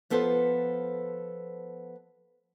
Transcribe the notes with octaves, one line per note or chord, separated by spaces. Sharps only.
F3 B3 A4 B4 C5